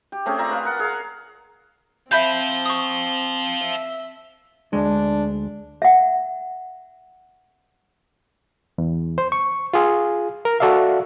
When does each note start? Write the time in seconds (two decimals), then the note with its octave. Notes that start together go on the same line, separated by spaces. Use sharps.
0.12 G4
0.26 A3 C4 C#4 G#4
0.39 F4 D5 E5 A#5
0.51 F4 B4
0.65 A#4 F#5
0.79 G#4 F5 A#5
2.11 C4 C5 E5 F5 B5 G6
2.65 C#6 D#6
3.63 E5
4.73 D2 G#3 D4
5.82 E5 F#5
8.78 E2
9.18 C5
9.32 C#6
9.74 F4 G#4
10.45 A#4
10.60 F#4 A4 D5 E5 F5